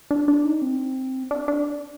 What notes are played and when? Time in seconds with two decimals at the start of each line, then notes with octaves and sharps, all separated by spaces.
0.11 D4
0.28 D4
0.45 D#4
0.62 C4
1.31 D4
1.48 D4